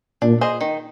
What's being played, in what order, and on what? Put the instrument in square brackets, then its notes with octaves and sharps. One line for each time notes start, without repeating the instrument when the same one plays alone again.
[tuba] A#2 [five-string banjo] D4
[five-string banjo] G#4 C5 D#5
D#3